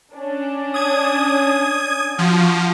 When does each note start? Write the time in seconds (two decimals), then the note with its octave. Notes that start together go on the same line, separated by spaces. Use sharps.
0.16 C#4 D4
0.74 D#6 G#6
2.18 F3 F#4